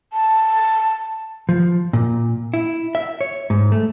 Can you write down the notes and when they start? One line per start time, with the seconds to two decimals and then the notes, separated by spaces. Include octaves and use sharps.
0.13 A5
1.49 F3
1.93 A#2
2.54 E4
2.95 E5
3.21 C#5
3.50 G#2
3.72 A3